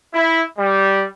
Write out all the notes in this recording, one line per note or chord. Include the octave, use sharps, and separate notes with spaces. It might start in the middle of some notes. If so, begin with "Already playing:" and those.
E4
G3